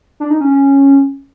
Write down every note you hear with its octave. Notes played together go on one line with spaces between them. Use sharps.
D4
D#4
C#4
C#4